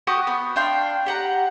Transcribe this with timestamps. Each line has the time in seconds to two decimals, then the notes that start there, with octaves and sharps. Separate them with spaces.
0.07 F#4 G4 C#6 D#6
0.27 B3
0.56 D4 F5 G5 C6
1.06 G4 F#5 A#5